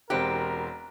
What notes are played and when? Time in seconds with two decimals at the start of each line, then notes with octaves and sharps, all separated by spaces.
0.10 E1 C4 G4 A#4 F#6